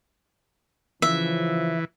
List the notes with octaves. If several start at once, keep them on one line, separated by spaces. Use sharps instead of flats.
C#3 E3 F3 E5